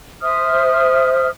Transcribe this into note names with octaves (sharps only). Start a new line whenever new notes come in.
C5 E5 D#6 F6